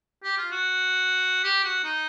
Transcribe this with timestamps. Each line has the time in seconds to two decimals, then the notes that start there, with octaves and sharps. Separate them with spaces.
0.23 G4
0.37 F4
0.51 F#4
1.44 G4
1.64 F#4
1.84 D#4